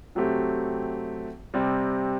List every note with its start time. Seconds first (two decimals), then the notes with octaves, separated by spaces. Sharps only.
0.15 C3 F#3 A3 C4 G4
1.54 C3 G3 C4